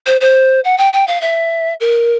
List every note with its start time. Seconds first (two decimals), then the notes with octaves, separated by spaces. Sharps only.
0.06 C5
0.21 C5
0.64 F#5
0.78 G5
0.93 G5
1.07 F5
1.21 E5
1.80 A#4